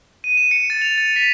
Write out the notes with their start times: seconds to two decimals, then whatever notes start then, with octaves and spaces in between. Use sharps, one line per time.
0.24 D#7
0.37 E7
0.51 C#7
0.70 A6
0.82 F7
0.98 A6
1.16 B6